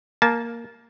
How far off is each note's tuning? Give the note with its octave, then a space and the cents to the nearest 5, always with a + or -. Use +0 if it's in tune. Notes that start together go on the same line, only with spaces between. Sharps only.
A#3 +0 A5 -20